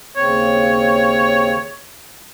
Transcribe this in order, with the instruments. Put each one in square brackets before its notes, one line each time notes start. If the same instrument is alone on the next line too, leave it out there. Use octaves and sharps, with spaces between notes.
[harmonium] D#2 C#3 C4 [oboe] C#5